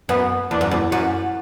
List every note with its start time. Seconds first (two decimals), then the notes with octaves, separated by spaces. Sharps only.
0.09 F#2 B3
0.51 E2 D4
0.61 F#2
0.71 E2
0.91 F#2 F#4